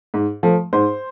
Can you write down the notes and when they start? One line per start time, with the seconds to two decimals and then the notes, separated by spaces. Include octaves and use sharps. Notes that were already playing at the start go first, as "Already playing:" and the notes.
0.14 G#2
0.43 F3 A3
0.73 G#2 C5